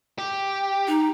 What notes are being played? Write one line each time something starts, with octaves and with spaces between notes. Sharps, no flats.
G4
D#4